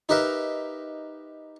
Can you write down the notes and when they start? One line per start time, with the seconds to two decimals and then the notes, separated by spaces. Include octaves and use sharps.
0.09 D#4 G4 A#4 B4 E5